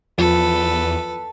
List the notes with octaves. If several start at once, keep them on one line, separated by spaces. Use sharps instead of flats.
E2 F3 A4 B4